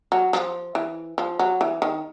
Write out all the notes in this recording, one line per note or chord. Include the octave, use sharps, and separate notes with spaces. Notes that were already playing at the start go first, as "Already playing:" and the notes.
F#3
F3
E3
F3
F#3
E3
D#3